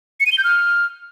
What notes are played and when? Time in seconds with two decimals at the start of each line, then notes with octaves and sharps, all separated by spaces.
0.20 C#7
0.26 D#7
0.32 G7
0.38 G6
0.44 F6